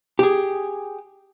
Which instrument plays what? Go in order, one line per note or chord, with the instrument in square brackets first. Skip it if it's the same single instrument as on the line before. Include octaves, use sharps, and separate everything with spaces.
[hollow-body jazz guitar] G4 G#4